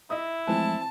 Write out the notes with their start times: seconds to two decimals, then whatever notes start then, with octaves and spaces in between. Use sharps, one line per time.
0.10 E4 D#5 E5 D#6
0.47 E3 F3 G#3 A3 C4 G#5 A5